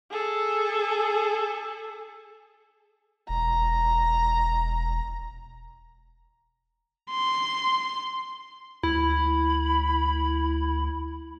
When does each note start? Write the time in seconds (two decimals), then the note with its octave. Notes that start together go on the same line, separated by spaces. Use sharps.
0.10 G#4 A4
3.29 E1 A#5
7.11 C6
8.83 D2 E4 B5